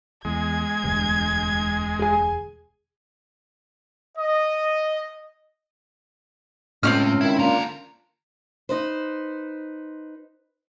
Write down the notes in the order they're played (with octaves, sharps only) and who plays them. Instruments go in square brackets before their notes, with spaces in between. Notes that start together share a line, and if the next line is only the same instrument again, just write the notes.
[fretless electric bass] E2 [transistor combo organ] G#3 [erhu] G#6
[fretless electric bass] E1 D2 G2
[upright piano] G#4 G#5
[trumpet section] D#5
[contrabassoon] C#2 [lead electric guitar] A2 [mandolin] C4 C#4 F6
[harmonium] D#3 [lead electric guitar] E4
[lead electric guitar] D3 A#5 [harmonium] A#3 D4 F4
[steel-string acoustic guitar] D#4 B4 C5